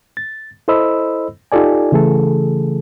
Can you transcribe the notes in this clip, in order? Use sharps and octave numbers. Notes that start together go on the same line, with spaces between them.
A6
E4 A4 C5 D#5 B5 E6
D#4 F4 G4 A4 D5 G#5
C#3 E3 A3 G#4 A4